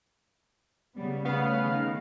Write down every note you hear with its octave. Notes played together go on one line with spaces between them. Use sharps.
C#3 G3 B3
C#3 A3 B3 F5
D#3